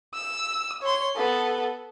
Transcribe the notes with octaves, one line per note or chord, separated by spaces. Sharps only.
E6
C#5 C6
B3 A4